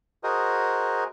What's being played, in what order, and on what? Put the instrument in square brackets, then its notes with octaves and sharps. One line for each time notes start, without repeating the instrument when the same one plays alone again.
[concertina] F#4 G#4 A#4 C5 D#5